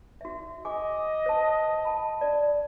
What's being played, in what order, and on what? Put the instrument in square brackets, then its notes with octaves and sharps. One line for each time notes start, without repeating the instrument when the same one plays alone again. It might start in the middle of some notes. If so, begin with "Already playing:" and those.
[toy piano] F#4 E5
[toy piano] G#4 G#5 D6 [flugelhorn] D#5
[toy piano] C5 A5
A5 B5
D5